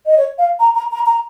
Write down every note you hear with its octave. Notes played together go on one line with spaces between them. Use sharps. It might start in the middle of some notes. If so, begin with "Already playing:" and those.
D#5
C#5
F5
A#5
A#5
A#5
A#5